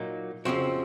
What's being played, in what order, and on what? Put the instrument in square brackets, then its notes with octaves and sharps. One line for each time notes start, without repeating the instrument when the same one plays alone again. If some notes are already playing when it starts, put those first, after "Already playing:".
Already playing: [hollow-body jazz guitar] A#2 F#3 A#3 D#4 F#4
F2 C#3 F3 C4 F#4